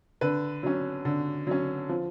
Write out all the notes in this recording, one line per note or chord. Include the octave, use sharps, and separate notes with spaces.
D3 B4
F#3 C#4
D3
F#3 C#4
F3